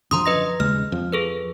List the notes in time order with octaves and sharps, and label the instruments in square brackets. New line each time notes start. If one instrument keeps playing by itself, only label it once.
[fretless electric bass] F#2 D3 F3 [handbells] A#5 C6 D#6
[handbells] B4 D#5 A#6
[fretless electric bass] D#2 C#3 G#3 [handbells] F6
[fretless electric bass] F2 F3
[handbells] G#4 A4 B4